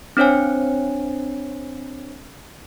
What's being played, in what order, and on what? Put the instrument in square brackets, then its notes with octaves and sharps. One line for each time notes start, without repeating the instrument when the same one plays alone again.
[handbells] C4 D4 C5 C#5 G#5